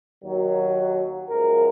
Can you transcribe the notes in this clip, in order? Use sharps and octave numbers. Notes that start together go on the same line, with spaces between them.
D#2 D#3 F#3
F#2 F3 G#3 A#4